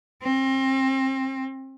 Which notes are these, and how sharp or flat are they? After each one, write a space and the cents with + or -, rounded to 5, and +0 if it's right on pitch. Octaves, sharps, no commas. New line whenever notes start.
C4 +30